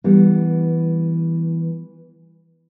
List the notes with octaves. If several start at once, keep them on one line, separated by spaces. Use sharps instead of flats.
E3 G3 B3